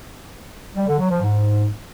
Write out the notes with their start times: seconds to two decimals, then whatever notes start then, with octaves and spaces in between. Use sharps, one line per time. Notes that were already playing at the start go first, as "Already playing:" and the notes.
0.76 G3
0.87 D3
0.99 F#3
1.10 F3
1.21 G#2